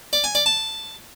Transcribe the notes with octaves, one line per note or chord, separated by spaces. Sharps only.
D5
G#5
D5
A5